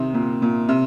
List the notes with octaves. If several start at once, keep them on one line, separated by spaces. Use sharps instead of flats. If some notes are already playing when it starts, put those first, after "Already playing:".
Already playing: C3 D#3
A#2
A#2
C3